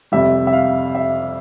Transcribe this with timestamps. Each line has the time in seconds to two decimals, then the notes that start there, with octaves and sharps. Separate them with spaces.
0.12 F2 C3 G3 E5
0.47 E5
0.53 F5
0.95 E5